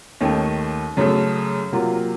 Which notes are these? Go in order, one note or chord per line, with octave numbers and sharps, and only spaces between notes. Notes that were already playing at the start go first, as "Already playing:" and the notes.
D#2 D#3 A3 C#4
F#2 C#3 A3
C3 F#3 A#3 F4